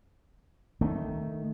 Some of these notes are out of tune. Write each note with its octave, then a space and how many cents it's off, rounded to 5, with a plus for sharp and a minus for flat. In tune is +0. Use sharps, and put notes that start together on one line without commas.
D#3 +0 A3 +0